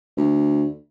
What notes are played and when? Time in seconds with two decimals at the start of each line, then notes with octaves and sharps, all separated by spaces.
0.17 D2